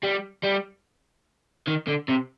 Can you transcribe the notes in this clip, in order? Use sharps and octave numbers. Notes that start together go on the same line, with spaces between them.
G3
G3
D#3
D3
C3